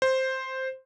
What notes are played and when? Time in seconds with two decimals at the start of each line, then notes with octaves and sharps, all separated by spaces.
0.02 C5